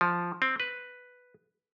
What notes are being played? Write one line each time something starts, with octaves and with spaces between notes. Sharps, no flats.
F3
C4
B4